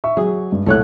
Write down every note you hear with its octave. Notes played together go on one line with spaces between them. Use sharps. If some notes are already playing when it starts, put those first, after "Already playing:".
E5 C#6
F#3 G#4
G2
C2 A#2 A3 C#5 F#6